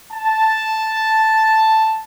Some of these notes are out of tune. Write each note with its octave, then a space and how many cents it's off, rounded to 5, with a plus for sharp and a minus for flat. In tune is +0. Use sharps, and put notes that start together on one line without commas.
A5 +0